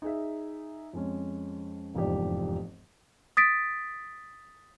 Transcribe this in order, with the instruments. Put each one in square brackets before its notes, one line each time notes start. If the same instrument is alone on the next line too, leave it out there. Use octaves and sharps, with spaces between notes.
[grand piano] D#4 G#4 E5
F2 G#3 C#4
F1 E2 G#2 F3 G4 D5
[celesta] D#6 A6 B6 D7